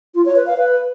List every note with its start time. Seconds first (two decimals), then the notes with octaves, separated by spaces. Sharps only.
0.15 F4
0.25 C#5
0.36 B4
0.46 F5
0.57 B4